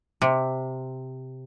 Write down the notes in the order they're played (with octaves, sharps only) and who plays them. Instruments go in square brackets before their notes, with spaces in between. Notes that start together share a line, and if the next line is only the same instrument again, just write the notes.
[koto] C3